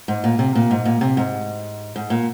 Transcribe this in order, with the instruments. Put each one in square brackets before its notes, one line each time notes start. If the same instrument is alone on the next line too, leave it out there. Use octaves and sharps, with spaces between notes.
[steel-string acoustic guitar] G#2
A#2
C3
A#2
G#2
A#2
C3
G#2
G#2
A#2